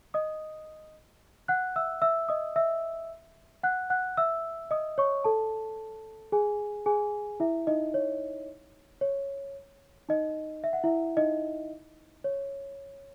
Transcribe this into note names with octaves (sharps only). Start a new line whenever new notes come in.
D#5 D#6
F#5 F#6
E5 E6
E5 E6
D#5 D#6
E5 E6
F#5 F#6
F#5 F#6
E5 E6
D#5 D#6
C#5 C#6
A4 A5
G#4 G#5
G#4 G#5
E4 E5
D#4 D#5
C#5
C#5
D#4 D#5
E5
F#5
E4 E5
D#4 D#5
C#5